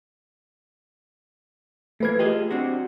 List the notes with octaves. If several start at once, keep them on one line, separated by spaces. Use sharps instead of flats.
A#2 E3 A3 A#3 B4 G#6
F4 G4 G#4 D#5
C4 D4 F#4